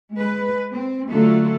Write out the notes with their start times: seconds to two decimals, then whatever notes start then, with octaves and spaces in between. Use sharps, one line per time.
0.16 G#3 B4
0.71 C4
1.09 D3 F#3 A3 F4 F#4 A4